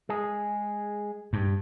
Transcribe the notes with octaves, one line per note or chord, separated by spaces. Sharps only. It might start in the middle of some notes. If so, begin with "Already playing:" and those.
G#3 G#4
G2